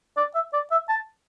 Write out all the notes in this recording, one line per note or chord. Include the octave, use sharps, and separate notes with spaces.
D5
E5
D5
E5
A5